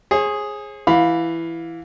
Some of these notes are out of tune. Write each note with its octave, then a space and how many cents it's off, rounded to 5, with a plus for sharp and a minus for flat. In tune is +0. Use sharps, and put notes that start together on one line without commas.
G#4 +0 C#5 -45
E3 +10 F5 +20 B5 +0